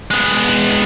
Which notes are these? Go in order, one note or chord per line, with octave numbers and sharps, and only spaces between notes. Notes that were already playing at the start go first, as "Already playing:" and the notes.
G#3 B3